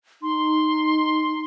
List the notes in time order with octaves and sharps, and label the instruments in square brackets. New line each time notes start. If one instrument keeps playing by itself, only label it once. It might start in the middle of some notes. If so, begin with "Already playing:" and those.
[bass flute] D#4 [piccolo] C6